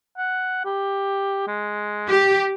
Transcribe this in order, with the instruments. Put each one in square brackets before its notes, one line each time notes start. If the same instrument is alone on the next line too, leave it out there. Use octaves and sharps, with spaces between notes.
[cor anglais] F#5
G4
G#3
[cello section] G4